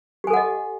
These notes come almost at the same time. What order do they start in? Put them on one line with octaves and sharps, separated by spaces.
G4 G#5 A4 F#5 D#5